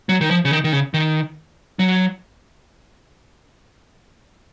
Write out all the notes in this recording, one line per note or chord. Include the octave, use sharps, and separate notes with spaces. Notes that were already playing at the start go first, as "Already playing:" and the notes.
F#3
D#3
F3
C#3
D#3
D#3
C#3
D#3
F#3